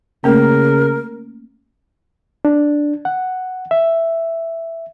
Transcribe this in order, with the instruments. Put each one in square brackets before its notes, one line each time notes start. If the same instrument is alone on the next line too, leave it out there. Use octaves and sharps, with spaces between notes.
[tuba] C#3 [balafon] A3 A#3 C#4 [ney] A#4
[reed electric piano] D4
F#5
E5